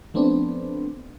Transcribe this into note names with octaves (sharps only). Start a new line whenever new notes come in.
F3 A3 B3 C4 D4